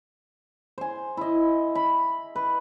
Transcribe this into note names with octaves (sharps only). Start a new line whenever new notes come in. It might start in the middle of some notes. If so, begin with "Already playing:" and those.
C5 G#5
E4 D#5
B5
B4